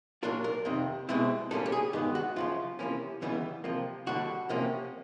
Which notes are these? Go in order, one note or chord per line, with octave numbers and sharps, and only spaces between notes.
A#2 F#3 A#3 D4 F4 A#4
A#4
F2 C3 D#3
C2 B2 G#3 C4 E4
A#2 G3 A#3 C#4 A4
G4
G#4
G2 D#3 G#3 B3 G4
F#4
F#2 C#3 F3 F4
C3 F3 A#3 C#4 E4
D#2 C#3 E3 G3 B3
C3 F3 A#3
D#2 D3 G3 F#4
C3 F3 A#3 C#4